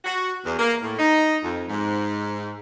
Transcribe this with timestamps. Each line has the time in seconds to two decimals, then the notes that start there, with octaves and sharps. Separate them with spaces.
0.04 F#4
0.45 E2
0.59 A#3
0.82 A2
0.99 D#4
1.43 F2
1.68 G#2